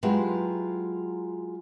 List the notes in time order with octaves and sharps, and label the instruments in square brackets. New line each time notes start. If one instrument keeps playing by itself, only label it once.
[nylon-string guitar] F#3 G#3 E4 F4 G4 B4